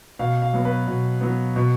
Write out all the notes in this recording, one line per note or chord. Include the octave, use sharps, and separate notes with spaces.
B2 F5
F5
F#3 B3
B4
B2
F#3 B3
B2